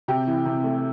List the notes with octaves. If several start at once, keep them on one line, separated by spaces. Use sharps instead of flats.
C3 G4
E3
C3
A3